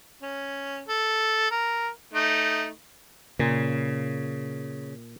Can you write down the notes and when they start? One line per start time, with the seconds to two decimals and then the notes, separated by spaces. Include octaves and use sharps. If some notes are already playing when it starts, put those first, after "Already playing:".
0.22 C#4
0.88 A4
1.51 A#4
2.13 A3 D#4
3.39 A#2 C#3